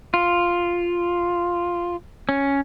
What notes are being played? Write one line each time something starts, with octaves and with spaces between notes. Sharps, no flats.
F4
C#4